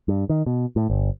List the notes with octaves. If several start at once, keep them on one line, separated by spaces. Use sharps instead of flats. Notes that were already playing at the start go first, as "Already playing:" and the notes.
G2
D#3
B2
A2
G1